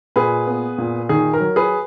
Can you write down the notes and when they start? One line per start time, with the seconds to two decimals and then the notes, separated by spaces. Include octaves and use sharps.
0.16 A#2 G#4 B4
0.47 B3
0.78 A#2
1.09 D#3 G#4
1.33 A#4
1.40 F#3
1.56 G#4 B4